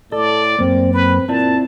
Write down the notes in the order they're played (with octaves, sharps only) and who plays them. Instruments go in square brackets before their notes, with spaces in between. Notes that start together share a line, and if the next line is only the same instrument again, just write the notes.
[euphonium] A2 [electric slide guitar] A4 [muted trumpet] D5
[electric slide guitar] F#2 A#3 [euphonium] C4
[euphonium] C4 [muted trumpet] B4
[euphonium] A#2 [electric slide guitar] C4 E4 D5 [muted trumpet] A5